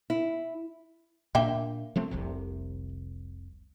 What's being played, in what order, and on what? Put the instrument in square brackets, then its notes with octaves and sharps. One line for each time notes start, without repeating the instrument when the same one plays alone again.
[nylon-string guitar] E4
[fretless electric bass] A#2 D4 [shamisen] A#3 E5 G5
[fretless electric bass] F3 A3 C4
F1 C2 C3